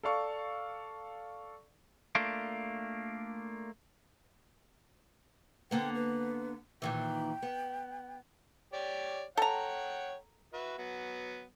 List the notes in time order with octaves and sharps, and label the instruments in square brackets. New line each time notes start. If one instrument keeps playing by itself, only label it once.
[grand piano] A4 D5 F5 C#6
[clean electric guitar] A3 A#3 D4 F4
[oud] D3 A#3 B3 [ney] G5
[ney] B4
[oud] A#2 D#3 E3 [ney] G5
[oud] B3
[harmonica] G4 C#5 D5
[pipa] A4 A#5 [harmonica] C#5 F#5 G5
[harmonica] F#4 B4 E5
F#3 B3